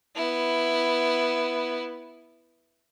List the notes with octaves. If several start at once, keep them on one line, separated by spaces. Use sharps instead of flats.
B3 E4